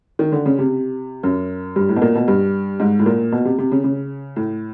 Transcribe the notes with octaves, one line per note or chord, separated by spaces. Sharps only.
D#3
D3
C#3
C3
F#2
G2
A2
B2
A#2
B2
G2
G#2
A2
A#2
B2
C3
C3
C#3
C#3
A2